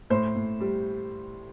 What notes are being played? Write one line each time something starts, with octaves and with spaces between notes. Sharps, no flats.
A2 C5
A2
G3